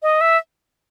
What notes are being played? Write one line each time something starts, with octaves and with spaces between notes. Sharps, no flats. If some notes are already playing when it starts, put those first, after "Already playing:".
D#5
E5